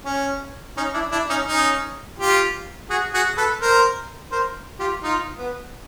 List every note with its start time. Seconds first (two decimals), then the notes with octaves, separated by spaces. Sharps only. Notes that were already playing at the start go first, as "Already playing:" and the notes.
0.05 C#4
0.77 C#4 D#4
0.94 D4 E4
1.12 D4 E4
1.29 C#4 D#4
1.48 C#4 D#4
2.18 F4 G4
2.90 F#4 G#4
3.14 F#4 G#4
3.37 A4 B4
3.61 A#4 C5
4.32 A#4 C5
4.79 F4 G4
5.03 D#4 F4
5.38 B3